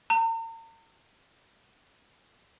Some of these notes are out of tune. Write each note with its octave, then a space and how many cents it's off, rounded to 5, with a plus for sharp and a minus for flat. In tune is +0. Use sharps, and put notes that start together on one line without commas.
A#5 -40